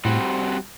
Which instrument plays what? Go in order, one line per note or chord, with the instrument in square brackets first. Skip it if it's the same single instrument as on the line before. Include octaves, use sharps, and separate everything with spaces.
[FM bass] A2 [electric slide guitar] G3 C4 F#4